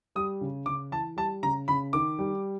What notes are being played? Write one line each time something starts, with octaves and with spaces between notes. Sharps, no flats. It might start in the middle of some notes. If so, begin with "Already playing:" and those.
G3 D#6
C#3
C#3 D6
E3 A5
G3 A5
C#3 A#5
C#3 B5
D#3 D6
G3